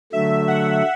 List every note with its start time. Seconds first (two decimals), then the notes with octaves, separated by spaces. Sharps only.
0.12 D3 F#3 A3 E5
0.48 F#5